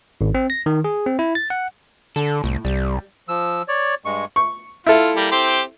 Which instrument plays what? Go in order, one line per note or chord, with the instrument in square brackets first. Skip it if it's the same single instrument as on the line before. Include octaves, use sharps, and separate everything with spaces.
[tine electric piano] G#1
C4
A#6
D#3
G#4
C4
E4
A6
F#5
[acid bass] D3 [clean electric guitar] A4
[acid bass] C2 [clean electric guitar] A2
[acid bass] C2 [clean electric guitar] G3
[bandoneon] F3 E6
C#5 D5
G2 G#3 C#6
[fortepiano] C#6
[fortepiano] E4 A4 [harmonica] F4
[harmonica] G3 A#3
C4 G4 C6